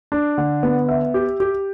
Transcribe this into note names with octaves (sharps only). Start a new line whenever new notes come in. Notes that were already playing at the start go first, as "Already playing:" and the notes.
D4
D3
B3
E5
G4
G4